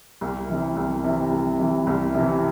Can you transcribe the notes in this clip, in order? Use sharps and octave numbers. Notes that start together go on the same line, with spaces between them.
C2
C3 E3
C2
C3 E3
C2
C3 E3
C2
C3 E3